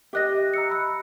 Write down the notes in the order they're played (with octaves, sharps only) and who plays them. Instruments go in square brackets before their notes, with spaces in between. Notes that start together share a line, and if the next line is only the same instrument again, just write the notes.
[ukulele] G4 D#5 [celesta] E5 F#6 A#6
[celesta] A#5 E6 C#7
B5 E6 F#6